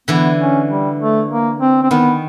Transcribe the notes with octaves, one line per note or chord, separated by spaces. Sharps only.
D3 E3 B3
C#4
G3
A3
A#3
C4
C4
D#3 B3